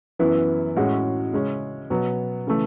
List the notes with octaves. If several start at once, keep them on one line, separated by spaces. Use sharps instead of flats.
F#2 E3 B3 E4
A2 G#3 C#4 F#4
C#3 G#3 C#4
B2 F#3 B3
C#3 E3 A3